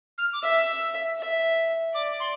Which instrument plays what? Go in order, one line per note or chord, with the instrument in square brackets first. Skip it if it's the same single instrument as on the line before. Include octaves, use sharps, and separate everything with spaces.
[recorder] F6
D6
[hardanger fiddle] E5 [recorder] E6
[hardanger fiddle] E5
[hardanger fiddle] D5 [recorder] D6
[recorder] C6